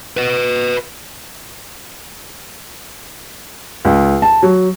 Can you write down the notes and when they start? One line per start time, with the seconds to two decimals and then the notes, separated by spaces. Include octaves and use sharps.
0.17 B4 D#5
3.85 C#2
4.22 A5
4.43 F#3